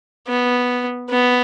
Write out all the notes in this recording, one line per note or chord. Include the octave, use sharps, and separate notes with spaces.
B3
B3